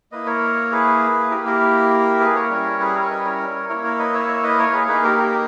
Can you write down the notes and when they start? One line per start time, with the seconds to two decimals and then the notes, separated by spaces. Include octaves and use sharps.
0.12 A#3 E4 B4 D#5
0.26 A#4 C#5
0.72 G#4 B4
1.30 A#3 E4 G4 A#4
1.45 G4 A#4
2.20 G#4 B4
2.35 A#4 C#5
2.50 G3 C#4 E4
2.80 G#4 B4
2.94 A#4 C#5
3.10 B4 D#5
3.25 A#4 C#5
3.69 A#3 E4 A#4 C#5
3.84 A#4 C#5
3.99 B4 D#5
4.14 C#5 E5
4.28 C#5 E5
4.43 B4 D#5
4.59 A#4 C#5
4.73 G#4 B4
4.88 A#3 D#4 G#4 B4
5.04 G4 A#4
5.18 G4 A#4